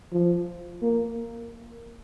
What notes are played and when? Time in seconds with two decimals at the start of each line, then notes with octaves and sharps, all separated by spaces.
0.12 F3
0.82 A#3